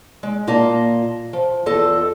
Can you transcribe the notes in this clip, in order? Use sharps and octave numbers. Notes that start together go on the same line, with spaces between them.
G#3
A#2 A#3 F4 D#5 A5 A#5
F3
E2 F4 A4 D#5